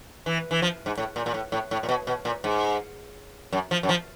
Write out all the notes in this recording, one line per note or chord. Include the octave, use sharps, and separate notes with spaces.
E3
E3
F3
G#2
A2
A#2
A#2
A2
A2
A2
A#2
B2
B2
A#2
G#2
F#2
F3
F#2
F3